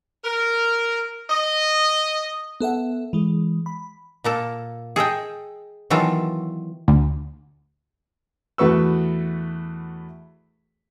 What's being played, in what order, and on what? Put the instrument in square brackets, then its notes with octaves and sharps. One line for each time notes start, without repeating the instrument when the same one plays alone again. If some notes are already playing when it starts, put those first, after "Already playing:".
[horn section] A#4
D#5
[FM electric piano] B3 A4 E5 F#5
E3 G#3
B5
[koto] A#2 A#3 A4
G#4 A4 D#5 G5
D#3 E3 F#3 B3 F4 A4
[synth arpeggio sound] D2
[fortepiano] E2 A3 F#4 B4 C#6 E6